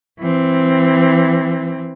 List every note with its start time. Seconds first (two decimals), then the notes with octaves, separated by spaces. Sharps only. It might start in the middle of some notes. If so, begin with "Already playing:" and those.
0.19 E3 C4